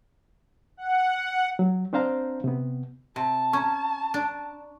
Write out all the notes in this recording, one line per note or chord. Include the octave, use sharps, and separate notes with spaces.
F#5
F#3
C4 D4 C5 F5 A#5
C3 B3
C3 A5
C#4 A#5 C#6
D4